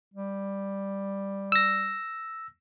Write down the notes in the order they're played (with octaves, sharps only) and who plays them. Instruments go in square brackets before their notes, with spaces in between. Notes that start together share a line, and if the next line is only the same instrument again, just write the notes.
[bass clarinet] G3
[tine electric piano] E6 A#6